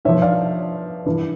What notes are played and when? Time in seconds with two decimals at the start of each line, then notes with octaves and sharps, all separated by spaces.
0.05 G2 F3 C#5 E5
0.22 D5 F5
1.06 G2 E3